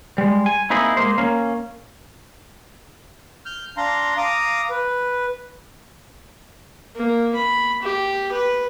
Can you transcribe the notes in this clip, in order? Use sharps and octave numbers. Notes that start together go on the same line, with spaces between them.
G3 G#3
G#5
A#3 C4 D#4 E4 G#4
G#3 A#3 C5
A#3 C#4
F6 G6
D4 F5 A#5 C6
F5 A#5 D6 D#6
B4
A#3
B5
G4
B4